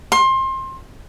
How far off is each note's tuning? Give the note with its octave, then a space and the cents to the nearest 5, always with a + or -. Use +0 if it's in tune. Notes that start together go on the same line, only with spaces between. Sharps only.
C6 +25